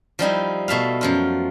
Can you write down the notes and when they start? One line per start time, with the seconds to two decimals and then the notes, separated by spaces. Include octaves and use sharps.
0.19 F3 G3 D#4 E4
0.68 B2 A3 E5 F5
1.01 F#2 F3 F4